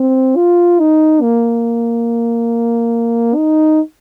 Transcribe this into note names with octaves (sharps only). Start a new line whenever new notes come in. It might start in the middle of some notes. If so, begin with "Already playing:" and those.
Already playing: C4
F4
D#4
A#3
D#4